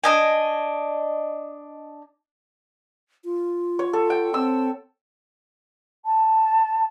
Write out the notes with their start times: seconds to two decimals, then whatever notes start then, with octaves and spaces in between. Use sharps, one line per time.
0.04 D4 D#5 G#5
3.25 F4
3.79 C#5
3.93 A4
4.10 G5
4.34 C4 E6
6.05 A5